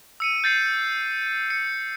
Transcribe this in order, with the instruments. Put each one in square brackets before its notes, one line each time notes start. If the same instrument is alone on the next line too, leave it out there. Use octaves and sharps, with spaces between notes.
[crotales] E6 C#7 D#7
G6 A6 C7 C#7
C#7